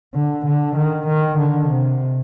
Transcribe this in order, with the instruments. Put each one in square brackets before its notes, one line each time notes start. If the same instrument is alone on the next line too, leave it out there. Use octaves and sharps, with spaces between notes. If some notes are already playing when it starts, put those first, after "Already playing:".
[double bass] D3
D3
D#3
D#3
D3
C3